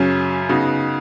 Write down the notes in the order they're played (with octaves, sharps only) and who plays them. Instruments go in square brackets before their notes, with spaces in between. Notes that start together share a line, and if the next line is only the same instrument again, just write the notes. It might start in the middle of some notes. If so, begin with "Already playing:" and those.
Already playing: [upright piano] F#2 C#3 F#3 C#4
C#3 B3 D#4 F#4